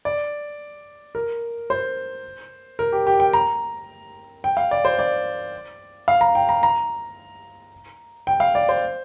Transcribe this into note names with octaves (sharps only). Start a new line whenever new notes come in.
D5
A#4
C5
A#4
G4
G4
G5
A#5
G5
F5
D5
C5
D5
F5
A#5
G5
A#5
A#5
G5
F5
D5
C5